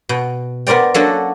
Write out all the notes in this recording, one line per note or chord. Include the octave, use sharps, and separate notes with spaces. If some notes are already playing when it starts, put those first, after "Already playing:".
B2
B3 A#4 C5 D5 G5
F#3 A#3 C#4 D4 F#4 A4